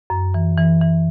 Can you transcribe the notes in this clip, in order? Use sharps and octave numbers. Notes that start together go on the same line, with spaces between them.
F#2
E3
E3
E3